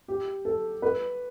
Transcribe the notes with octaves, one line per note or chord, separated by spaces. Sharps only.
G4
A4
B4